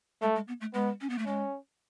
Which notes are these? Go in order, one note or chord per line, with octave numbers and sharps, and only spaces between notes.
G#3 A3
G#3
B3
A3
G#3 B3
C#4
B3
A3
G#3 C#4